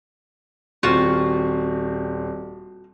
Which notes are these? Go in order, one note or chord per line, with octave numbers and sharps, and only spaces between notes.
D#1 C4 F4 F#4